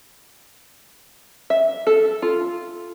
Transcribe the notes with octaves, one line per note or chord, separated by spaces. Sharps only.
E5
A4
F4